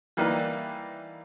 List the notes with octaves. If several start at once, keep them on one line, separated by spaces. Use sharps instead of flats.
E3 G3 A#3 D#4 B4